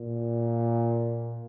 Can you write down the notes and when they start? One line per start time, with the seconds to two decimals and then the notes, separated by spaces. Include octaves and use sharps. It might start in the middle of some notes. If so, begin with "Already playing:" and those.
Already playing: A#2